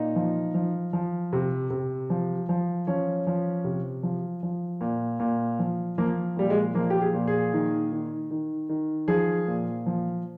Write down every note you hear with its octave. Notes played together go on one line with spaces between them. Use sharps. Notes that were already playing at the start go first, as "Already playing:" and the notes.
Already playing: A#2 D#4
F3
F3
F3
C3
C3
F3
F3
F3 C#4
F3
C3
F3
F3
A#2
A#2
F3
F3 A#3
A#2 G3
G#3
F3 A#3
G4
G#4
A#2
G#4
D#3
D#3
D#3
D#3
F3 G#4
A#2
F3